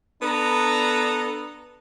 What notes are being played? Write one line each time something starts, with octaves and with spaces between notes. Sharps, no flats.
B3 D4 A4 B4 A#5